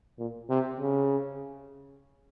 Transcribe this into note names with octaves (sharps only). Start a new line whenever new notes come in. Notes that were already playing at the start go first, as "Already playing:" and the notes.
A#2
C3
C#3